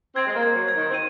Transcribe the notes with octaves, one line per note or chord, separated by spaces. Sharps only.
C4 G#6
G#3
A#3
G#6
F#3
G#6
D#3
C4
D#7